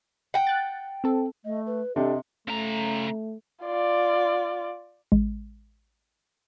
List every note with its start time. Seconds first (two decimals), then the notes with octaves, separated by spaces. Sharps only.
0.34 F#5 G5
0.47 F#6 A6
1.04 C4 A4
1.45 A3 D#5
1.66 B4
1.96 C3 D4 G4 A4 D#5 G5
2.47 C#3 A3 A#5
3.65 F4 D5
5.12 A1 G#3